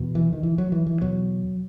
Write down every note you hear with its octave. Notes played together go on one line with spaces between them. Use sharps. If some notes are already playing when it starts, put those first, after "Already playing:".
Already playing: E2 B2
E3
D#3
E3
F#3
E3
E3
E2 B2 F#3